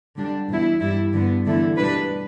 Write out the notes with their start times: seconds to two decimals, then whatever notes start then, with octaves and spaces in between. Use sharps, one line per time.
0.17 D3 G3 D4
0.48 E2 B2 B3 E4
0.81 G2 G3 E4
1.13 G2 D3 B3
1.45 E2 D3 A3 E4
1.77 B2 G3 D4 B4